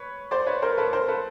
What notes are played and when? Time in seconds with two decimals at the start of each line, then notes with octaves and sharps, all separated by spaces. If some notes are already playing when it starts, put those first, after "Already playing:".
Already playing: B4 C#5
0.31 C5 D5
0.46 B4 C#5
0.62 A#4 C5
0.78 A4 B4
0.93 A#4 C5
1.08 A4 B4